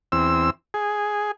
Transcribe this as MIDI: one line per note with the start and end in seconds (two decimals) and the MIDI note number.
0.12 0.50 40
0.12 0.50 60
0.12 0.50 88
0.74 1.31 68